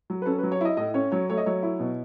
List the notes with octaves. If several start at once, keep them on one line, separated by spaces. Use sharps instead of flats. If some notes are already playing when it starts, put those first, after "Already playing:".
F#3
B4
C#4 A4
B4
F#3
C#5
E4 D#5
A2 D#5
C#4 C#5
F#3 C#5
A3 C#5
D#5
F#3 C#5
E4
B2